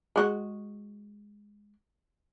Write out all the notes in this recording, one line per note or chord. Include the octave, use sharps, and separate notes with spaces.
G#3 F#4